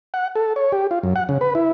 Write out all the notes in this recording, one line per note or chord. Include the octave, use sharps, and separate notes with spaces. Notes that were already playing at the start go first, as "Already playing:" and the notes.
F#5
A4
C#5
G4
F4
F#2
F#5
C#3
B4
E4